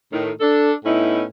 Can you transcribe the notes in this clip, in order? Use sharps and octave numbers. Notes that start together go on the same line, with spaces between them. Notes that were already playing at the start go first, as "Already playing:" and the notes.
A2 D#3
D4 A4
A2 B3 C#4 D#4 E4